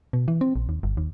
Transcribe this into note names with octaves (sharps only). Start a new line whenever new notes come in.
B2
E3
C4
A#1
D#2
G1
D#2